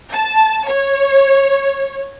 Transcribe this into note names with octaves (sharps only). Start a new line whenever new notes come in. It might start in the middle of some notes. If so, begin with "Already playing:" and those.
A5
C#5